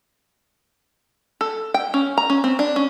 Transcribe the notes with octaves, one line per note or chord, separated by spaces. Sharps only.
A4
G5
C#4
A#5
C#4
C4
D4
C#4